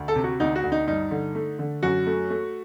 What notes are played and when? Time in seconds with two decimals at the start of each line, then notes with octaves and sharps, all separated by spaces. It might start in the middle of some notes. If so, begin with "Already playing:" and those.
Already playing: D2
0.08 A4
0.16 C3
0.24 F#4
0.40 D2 D#4
0.56 F#4
0.63 D2
0.72 D#4
0.87 G2 D#4
1.11 D3
1.35 A3
1.59 D3
1.83 F#2 F#4
2.06 A3
2.30 A3